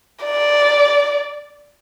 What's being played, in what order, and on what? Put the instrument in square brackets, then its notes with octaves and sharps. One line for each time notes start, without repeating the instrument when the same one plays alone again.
[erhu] D5